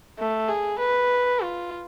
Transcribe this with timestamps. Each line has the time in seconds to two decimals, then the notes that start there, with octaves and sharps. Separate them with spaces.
0.18 A3
0.49 G#4
0.79 B4
1.40 F4